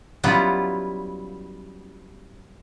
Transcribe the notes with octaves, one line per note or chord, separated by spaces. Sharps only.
F#3 G3 B3 C#4 E4 F4